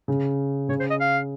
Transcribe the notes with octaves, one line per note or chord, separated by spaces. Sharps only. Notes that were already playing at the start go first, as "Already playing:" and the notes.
C#3
C#3 C#5
C5
D#5
F5